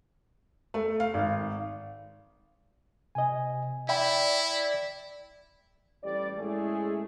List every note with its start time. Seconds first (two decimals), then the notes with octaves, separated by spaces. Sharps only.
0.74 A3
1.00 F5
1.14 G#1
3.15 C3 D#5 G#5
3.89 E4 D5 E5 G5 B5
6.03 A1 G3 D5
6.37 A2 G#3 A3 C#4 E4 G#4